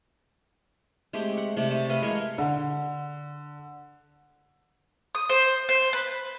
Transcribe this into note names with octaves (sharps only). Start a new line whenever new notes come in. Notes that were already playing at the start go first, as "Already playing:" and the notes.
G#3 A3 C4 G4
F#5
C3 A3 D5
C4 A5
B4 D#5 F5
E3 G#3 A#4 C#5
D3
D#6
C5
C5
B4